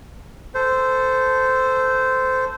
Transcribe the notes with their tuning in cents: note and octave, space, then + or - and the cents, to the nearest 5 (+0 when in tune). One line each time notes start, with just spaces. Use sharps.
A4 +0 C5 -15